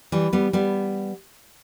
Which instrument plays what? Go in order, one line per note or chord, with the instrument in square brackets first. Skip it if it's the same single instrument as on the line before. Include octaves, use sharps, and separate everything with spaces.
[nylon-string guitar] E3 G3
G3 B3
G3 B3